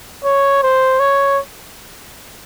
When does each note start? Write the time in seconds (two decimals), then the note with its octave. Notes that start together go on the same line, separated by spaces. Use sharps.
0.24 C#5
0.63 C5
1.00 C#5